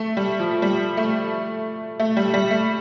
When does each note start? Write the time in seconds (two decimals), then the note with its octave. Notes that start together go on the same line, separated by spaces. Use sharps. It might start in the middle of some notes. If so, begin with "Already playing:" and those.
Already playing: A3
0.17 G3
0.40 F3
0.62 G3
0.97 A3
2.00 A3
2.17 G3
2.34 G3
2.51 A3